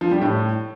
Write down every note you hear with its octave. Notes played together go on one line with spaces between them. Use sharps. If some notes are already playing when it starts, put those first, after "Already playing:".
F3
G3
A2